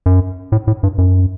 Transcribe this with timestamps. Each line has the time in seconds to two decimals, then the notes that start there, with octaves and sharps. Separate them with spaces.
0.06 F#2
0.52 A2
0.67 A2
0.83 G2
0.98 F#2